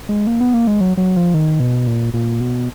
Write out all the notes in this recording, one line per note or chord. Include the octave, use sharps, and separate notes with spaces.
G#3
A#3
B3
A#3
G#3
F#3
F#3
F3
D#3
B2
A#2
A#2
B2